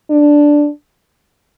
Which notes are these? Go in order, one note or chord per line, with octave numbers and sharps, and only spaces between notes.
D4